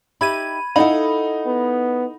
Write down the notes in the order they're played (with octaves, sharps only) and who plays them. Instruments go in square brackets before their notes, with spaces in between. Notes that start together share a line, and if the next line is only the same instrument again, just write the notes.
[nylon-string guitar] D#4 G4 E5 [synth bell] B5 G#6 D#7
[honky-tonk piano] D#4 [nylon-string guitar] E4 A4 F5 [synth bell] F#5 B5
[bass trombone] B3